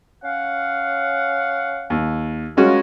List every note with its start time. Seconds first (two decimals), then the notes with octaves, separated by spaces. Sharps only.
0.24 C#4 F5 F#5
1.90 D#2
2.57 G#3 C#4 F4 F#4 A#4